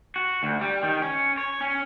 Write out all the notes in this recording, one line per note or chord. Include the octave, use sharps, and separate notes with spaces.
F#4
D2
G3
D#3
C#4
C#5
C#4